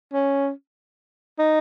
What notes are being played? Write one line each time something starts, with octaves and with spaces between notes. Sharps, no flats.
C#4
D#4